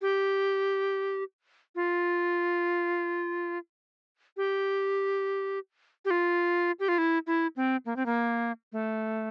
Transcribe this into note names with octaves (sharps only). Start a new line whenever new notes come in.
G4
F4
G4
G4
F4
G4
F4
E4
E4
C4
A#3
C4
A#3
A3